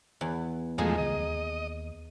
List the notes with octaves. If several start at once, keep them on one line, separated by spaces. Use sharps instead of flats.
E2
E2 B2 E3 F3 G#3 A3 D#4 G#4
C#2 D#3 F#3 D#5
D#2